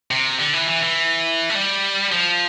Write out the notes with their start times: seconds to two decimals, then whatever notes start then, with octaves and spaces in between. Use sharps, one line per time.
0.11 C3
0.39 D3
0.53 E3
0.68 E3
0.83 E3
1.50 A3
1.55 G3
2.12 F3